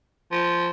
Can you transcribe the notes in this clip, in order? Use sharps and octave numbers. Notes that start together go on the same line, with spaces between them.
F3